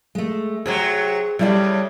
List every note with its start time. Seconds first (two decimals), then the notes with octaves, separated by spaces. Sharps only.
0.15 G#3 A3
0.66 C3 F#3 G#4 C5
1.39 A2 C#3 G3 E4 D5